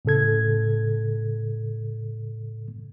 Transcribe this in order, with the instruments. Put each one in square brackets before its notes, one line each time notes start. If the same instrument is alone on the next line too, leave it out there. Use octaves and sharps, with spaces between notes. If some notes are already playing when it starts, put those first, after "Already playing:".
[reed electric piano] A2 C#3 A4 G#6